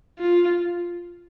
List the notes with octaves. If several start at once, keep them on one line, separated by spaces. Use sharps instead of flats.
F4